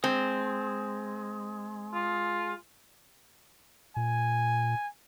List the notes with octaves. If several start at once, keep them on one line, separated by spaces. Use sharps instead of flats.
G#3 C4
F4
A#2 G#5